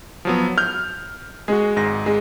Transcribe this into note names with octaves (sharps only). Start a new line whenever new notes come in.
F3 F#3 B3
F6 G6
G#3 F#4 G#4
G#1 G#2 A#6
G#3